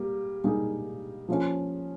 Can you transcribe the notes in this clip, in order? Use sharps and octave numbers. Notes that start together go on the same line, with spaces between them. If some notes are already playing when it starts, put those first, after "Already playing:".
Already playing: G3 A#3
G3 A#3 D#4 G#4
F3 A#3 C#4